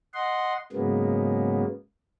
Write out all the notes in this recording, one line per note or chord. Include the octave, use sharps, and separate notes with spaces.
D#5 F#5 C6
G#2 C#3 F#3 G#3 A#3 B3